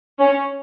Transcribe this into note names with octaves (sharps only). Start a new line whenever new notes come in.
C#4